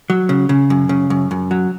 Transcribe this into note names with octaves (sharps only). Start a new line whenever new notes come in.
F#3
C#3
C#3
F#2
C#3
F#2
F#2
F#3